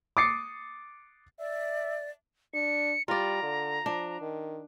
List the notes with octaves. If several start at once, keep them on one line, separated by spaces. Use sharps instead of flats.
D6 D#6 A6 C7 C#7
D5 E5
D4 C#7
G3 F4 D5 A#5
D3
F3 D4
D#3